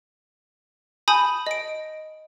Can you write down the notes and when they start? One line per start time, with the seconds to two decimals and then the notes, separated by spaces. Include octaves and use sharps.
1.08 G#5 A5 B5 D#6 G6
1.47 D#5 D7